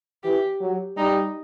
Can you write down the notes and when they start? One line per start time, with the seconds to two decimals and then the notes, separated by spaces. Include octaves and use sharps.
0.23 E3 G4
0.61 F#3
0.97 G3 D#4